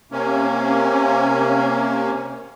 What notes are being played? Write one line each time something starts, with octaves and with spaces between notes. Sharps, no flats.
C3 A#3 C#4